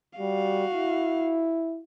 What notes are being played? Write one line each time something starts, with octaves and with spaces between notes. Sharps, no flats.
G3 F#4 F5
E4